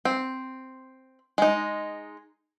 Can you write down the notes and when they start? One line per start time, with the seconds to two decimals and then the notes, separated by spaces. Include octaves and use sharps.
0.05 C4
1.38 G#3 D#4